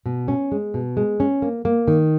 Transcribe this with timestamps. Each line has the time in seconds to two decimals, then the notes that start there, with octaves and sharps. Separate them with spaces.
0.06 B2
0.28 C#4
0.52 G#3
0.74 B2
0.97 G#3
1.20 C#4
1.42 A#3
1.65 A#3
1.88 D#3